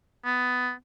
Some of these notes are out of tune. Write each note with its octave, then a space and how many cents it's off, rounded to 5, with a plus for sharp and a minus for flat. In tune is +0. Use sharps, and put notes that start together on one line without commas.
B3 +15